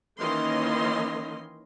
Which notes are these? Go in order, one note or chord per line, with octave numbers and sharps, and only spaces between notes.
D#3 E3 A#3 C#4 D#5 C6